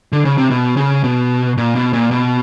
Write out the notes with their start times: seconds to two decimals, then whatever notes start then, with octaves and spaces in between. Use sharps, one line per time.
0.12 D3
0.25 C#3
0.38 C3
0.50 B2
0.77 C#3
1.04 B2
1.57 A#2
1.75 B2
1.93 A#2
2.11 B2